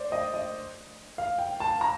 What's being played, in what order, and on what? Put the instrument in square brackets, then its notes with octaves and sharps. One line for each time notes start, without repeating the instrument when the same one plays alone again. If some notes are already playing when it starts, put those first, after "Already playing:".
Already playing: [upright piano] C5 D5
D#5
D#5
F5
G5
A5
A#5